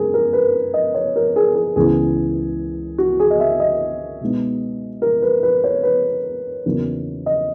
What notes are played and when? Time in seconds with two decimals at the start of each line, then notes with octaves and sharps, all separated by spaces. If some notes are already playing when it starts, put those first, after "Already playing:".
Already playing: F#2 C#3 G#3 G#4 A#4
0.14 A#4
0.33 B4
0.74 D#5
0.94 C#5
1.16 A#4
1.36 G#4
1.55 G#4
1.76 C#2 C#3 E3 B3 E4 G#4
2.98 F#4
3.20 G#4
3.30 D#5
3.40 E5
3.60 D#5
4.21 B2 G#3 B3 D#4
5.02 A#4
5.22 B4
5.43 B4
5.64 C#5
5.83 B4
6.66 E2 C#3 F#3 A#3 D#4
7.26 D#5